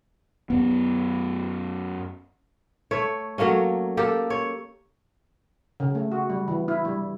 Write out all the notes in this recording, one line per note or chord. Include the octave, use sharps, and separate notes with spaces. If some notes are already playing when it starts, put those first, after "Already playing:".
F#2 B3
A3 C#5
F#3 A3 A#3 C#4
A#3 G4 A4
C#5
C#3
A3
F#4
G3
E3
E4
G3